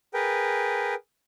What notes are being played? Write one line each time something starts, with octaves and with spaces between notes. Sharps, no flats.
G#4 A#4 B4 G5